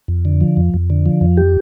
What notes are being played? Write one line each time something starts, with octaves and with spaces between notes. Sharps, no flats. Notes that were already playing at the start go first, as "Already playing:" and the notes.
F2
D3
F3
F2
F2
D3
F3
F2
G4